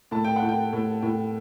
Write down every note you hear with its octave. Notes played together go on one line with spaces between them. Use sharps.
A2 A5
G5
F#5
A2
G5
A2
A2